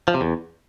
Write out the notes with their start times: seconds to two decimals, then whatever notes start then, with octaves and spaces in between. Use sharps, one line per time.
0.08 F3
0.14 C3
0.21 E2